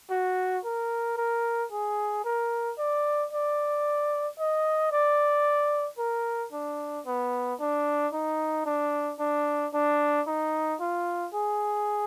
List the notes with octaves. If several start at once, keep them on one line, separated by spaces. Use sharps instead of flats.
F#4
A#4
A#4
G#4
A#4
D5
D5
D#5
D5
A#4
D4
B3
D4
D#4
D4
D4
D4
D#4
F4
G#4